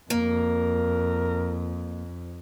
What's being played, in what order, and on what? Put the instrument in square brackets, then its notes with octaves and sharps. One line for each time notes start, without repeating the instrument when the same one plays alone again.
[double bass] F2 [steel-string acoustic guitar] A#3 [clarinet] A#4